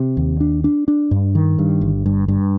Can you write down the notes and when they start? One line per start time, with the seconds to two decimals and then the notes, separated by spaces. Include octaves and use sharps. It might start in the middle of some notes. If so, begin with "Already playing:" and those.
Already playing: C3
0.17 D#2
0.40 D4
0.64 D4
0.88 D4
1.11 G2
1.35 D#3
1.59 G2
1.81 G1
2.06 G2
2.28 G2